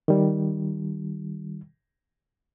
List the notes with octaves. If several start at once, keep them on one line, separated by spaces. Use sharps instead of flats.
D#3 G3